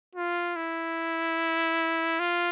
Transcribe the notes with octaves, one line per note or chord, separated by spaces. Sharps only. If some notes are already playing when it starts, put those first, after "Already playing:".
F4
E4
F4